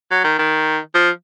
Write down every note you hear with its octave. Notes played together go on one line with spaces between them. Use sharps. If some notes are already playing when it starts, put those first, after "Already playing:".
F#3
D#3
D#3
F3